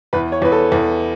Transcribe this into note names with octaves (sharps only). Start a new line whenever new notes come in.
E2 B4
C#5
E2 B4
A4
E2